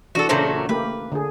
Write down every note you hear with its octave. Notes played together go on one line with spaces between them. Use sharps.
E3 D4 F#4 A4
A#2 C#3 F#3 A3 D4 C5
A3 A#3 G4 B4
D3 G#4